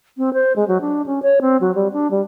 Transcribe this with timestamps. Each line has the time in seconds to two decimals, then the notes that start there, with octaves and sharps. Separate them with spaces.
0.18 C4
0.34 C5
0.56 G#3
0.68 F#3
0.81 D4
1.06 C#4
1.23 C#5
1.41 C4
1.61 F#3
1.75 G3
1.93 D4
2.11 G3